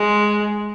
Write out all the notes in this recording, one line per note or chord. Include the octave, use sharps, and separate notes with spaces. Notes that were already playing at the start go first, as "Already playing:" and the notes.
Already playing: G#3